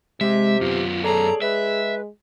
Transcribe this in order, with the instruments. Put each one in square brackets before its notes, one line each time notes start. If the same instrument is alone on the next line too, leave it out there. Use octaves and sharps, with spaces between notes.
[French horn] C3 [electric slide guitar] G#3 [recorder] G4 [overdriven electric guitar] E5
[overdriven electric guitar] F#2 B3 [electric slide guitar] F4
[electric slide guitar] G#4 C#5 D5 [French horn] A4 [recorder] A#5
[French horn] G#3 [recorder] B4 [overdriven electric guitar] E5